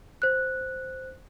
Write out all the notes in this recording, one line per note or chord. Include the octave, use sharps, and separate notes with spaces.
C5 F#6